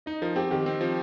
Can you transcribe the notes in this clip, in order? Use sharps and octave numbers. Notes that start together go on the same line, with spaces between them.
D#4 D#5
F3 A#4
C4 G4
D#3 G4
C4
F3